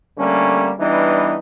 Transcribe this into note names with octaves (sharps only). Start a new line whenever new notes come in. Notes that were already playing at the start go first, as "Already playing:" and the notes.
D3 G3 A3 A#3 C#4
E3 G3 B3 D4 D#4